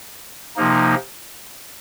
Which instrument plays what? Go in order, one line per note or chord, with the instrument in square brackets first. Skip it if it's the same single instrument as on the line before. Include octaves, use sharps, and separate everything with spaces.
[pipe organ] C3 F3 A#3 D#4